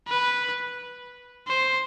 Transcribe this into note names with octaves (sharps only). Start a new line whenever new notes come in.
B4
C5